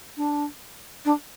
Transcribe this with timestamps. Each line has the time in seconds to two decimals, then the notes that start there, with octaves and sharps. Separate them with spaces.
0.17 D4
1.05 D4